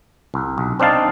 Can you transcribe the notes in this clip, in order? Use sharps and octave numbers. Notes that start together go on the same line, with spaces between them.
C2
B1
C4 D4 D#4 F5 A5